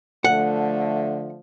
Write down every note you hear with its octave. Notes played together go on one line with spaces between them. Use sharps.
D3 F3 A3 F#5